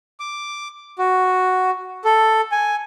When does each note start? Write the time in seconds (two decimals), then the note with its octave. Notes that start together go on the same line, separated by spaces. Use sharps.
0.20 D6
0.99 F#4
2.05 A4
2.52 G#5